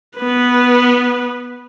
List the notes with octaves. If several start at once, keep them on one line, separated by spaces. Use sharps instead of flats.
B3 B4